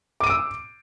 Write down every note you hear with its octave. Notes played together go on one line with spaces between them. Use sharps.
D6 E6 D7 D#7